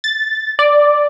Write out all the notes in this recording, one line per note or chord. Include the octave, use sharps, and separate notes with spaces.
A6
D5